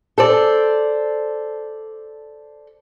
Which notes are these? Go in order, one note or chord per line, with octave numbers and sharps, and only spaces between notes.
A4 C5 D5